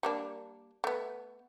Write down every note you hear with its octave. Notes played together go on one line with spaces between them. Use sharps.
G3 A#3 D4
A3 B3